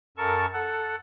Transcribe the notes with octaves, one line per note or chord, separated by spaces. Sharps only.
F#2 A4 A#4 A5 C#6
A4 F#5